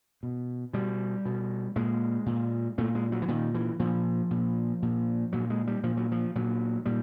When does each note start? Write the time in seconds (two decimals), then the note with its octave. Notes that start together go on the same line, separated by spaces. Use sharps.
0.23 B2
0.73 B2 G3
1.25 B2
1.76 A#2 G#3
2.26 A#2
2.78 A#2 A3
2.95 G#3
3.12 F#3
3.22 E3
3.28 A#2 D#3
3.55 E3
3.80 A#2 F3
4.31 A#2
4.82 A#2
5.33 A#2 F#3
5.50 G#3
5.67 G3
5.83 A#2 F3
5.97 F#3
6.12 F3
6.35 A#2 F#3
6.86 A#2 G3